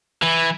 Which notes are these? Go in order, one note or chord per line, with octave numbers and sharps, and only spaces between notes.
E3